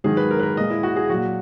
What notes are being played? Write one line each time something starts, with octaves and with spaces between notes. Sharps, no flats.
G#2 D#3 F#3 G#4
B4
A#4
B4
A#4
A#2 G#3 D#5
E4
F#4
G#4
A#2 F#3 F#4